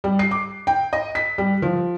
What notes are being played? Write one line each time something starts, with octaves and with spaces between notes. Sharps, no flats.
G3
C7
D6
G5
D#5
B6
G3
F3